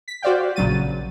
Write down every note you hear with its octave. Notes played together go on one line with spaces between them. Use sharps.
B6
F#4 C5 D5 F5 G5
A#1 C#3 F#3 A6 D#7